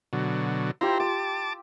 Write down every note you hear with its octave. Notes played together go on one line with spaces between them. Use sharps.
B2 D3 F#3
E4 F4 G4 C5 A#5
A5 D6 E6